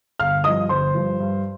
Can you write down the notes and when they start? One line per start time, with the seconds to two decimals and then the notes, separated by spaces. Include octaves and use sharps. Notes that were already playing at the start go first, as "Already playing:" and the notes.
0.20 G1 F5 F6
0.44 G2 F3 D#5 D#6
0.69 G1 C5 C6
0.95 G2 F3
1.20 G2